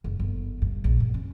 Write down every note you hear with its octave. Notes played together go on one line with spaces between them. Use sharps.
F#1
G1
G2
A#1
G2
C#4